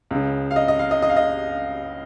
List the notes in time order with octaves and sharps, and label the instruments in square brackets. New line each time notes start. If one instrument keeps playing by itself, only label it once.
[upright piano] C#2 C#3
F5
D#5
D#5
F5
D#5
D#5
F5
D#5